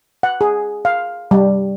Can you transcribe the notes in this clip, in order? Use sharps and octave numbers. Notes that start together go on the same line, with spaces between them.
F#5
G#4
F5
G3